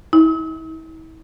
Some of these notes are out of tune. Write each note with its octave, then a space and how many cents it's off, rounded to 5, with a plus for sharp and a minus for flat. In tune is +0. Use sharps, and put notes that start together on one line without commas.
E4 -40